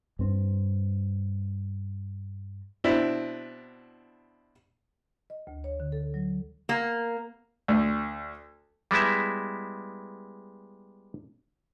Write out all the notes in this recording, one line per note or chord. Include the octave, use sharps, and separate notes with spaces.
G2 C4
B2 C4 D4 E4
D#5
D2
C#5
D3
A4
F#3
A#3
D2
G3 G#3 B3 E4 E5